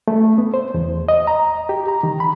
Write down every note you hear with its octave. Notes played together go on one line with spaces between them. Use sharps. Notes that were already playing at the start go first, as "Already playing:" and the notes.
A3
B3
C5
E2
D#5
A#5
G4
A#5
D#3
B5